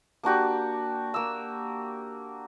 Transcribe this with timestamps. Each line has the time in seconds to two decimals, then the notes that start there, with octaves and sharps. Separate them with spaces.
0.23 A#3 D4 F#4 G4
1.14 A#3 E6